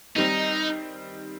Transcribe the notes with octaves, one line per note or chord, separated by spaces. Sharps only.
D#3 G3 C4 D#4